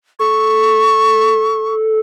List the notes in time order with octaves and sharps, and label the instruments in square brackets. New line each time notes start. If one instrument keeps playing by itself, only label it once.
[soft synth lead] A4 [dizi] C#6